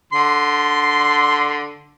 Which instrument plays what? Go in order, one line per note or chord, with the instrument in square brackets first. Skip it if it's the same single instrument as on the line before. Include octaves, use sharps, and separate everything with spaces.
[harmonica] D3 C6